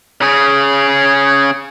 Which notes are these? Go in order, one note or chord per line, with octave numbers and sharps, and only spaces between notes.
C#3 G#4